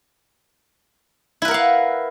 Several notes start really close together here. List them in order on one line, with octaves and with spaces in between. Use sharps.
E4 B4 A#4 F#5 F5